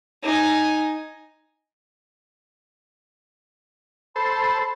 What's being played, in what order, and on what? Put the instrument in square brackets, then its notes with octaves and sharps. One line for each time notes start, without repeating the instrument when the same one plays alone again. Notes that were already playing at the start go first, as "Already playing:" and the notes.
[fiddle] D#4 G#5
[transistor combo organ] A4 C5 [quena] B5